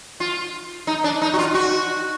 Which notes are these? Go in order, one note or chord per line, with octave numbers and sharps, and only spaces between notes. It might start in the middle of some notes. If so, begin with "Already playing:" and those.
F4
D#4
D4
D#4
F#4
F4
F#4